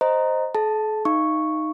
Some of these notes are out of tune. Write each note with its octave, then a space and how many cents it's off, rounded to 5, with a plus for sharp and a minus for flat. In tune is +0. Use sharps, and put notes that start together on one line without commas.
C5 +0 D#5 +0 A#5 +0
A4 -45 A5 +0
D#4 +0 F5 -25 C#6 -5